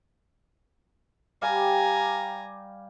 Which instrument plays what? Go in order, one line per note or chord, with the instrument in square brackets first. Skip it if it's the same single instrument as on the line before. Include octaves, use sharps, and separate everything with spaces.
[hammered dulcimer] G3 G4 F5 [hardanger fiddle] G#5 A#5